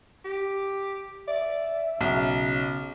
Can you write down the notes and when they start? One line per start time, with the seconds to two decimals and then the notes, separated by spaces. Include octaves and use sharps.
0.25 G4
1.28 D5 E5
2.01 B1 C#3 D#5